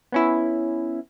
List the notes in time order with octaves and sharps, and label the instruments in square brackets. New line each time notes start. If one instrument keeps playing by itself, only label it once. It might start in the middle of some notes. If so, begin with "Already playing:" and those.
[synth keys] B3 C#4 E4